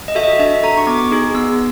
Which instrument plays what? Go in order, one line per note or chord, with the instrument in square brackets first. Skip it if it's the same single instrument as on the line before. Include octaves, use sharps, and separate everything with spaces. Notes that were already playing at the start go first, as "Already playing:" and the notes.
[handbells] D#5
F#4 A4 E5
D#5
D4 E5
F#4 A4 A#5
C#6
B3 D6
D#4 G#4
B3 E6